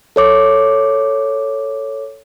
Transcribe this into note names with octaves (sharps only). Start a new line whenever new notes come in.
A4 C#5 D6